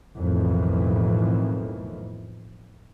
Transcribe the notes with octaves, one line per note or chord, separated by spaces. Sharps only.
B1 F2 A2 D#3 E3